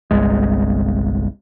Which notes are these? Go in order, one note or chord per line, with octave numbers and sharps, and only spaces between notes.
G1 C2 G#3